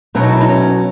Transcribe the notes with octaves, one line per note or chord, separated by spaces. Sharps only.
B2 F#3 A3 C#4
D#4
E4
D#4
C#4